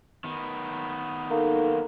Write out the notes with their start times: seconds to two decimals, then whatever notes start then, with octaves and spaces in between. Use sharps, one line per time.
0.24 D#3 B3
1.31 A#3 D#4 A4